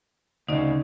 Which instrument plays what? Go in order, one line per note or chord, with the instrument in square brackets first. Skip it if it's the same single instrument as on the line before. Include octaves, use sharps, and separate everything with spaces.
[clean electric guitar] D2 C#3 [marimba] D#4 D5 D#5